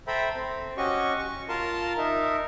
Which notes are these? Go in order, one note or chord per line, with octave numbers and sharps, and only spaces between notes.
A4 C5 E5 G5 A#5 B5
C4
C#4 F#4 G4 D#5 C#6
C#6
F4 A#4 A5 C6
D#4 A#4 E5